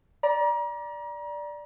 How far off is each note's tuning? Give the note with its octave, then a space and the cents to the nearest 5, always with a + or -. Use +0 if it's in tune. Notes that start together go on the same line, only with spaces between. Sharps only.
D5 +0 A#5 +35